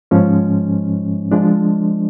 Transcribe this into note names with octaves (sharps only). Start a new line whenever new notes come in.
G#2 F3 G#3 C#4
F3 G#3 D4